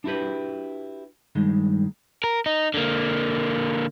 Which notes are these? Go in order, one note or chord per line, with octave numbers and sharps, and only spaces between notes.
D4 E4 F#4 G4 B4
G2 D#3 G#3
A#4
D#4
D3 A#3